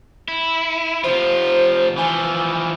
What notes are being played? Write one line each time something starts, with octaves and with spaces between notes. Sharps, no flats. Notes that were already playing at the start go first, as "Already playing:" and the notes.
E4
C3 F3 F4 C5
E3 F3 G#5